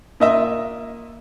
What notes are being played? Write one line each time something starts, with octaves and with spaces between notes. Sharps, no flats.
A#2 D#5 E5